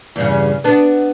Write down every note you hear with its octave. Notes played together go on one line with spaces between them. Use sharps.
E2 G2 C#3
B3 D4